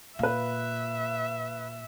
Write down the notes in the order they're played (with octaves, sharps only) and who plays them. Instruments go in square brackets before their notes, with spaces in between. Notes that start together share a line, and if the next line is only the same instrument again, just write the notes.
[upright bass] A#2 [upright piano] B4 F5 [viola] E5